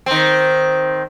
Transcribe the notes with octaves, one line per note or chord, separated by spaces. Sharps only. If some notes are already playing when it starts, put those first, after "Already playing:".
D#3 C4